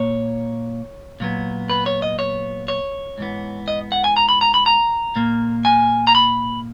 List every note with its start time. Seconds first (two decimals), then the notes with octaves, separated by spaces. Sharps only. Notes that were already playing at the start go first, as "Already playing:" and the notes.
Already playing: A#2 A#3 C#5
1.20 A#2 F#3 B3
1.70 B4
1.86 C#5
2.02 D#5
2.19 C#5
2.68 C#5
3.18 G#2 E3 B3
3.68 D#5
3.92 F#5
4.04 G#5
4.17 A#5
4.29 B5
4.41 A#5
4.54 B5
4.66 A#5
5.16 A#2 A#3
5.65 G#5
6.07 A#5
6.15 B5